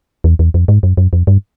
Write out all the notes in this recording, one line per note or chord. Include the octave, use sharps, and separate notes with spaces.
E2
E2
F2
G#2
F#2
F#2
F2
G2